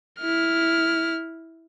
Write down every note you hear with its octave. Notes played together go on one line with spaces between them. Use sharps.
E4 F6